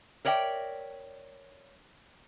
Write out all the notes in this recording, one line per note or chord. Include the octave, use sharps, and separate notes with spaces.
A#4 C#5 D5 E5 G5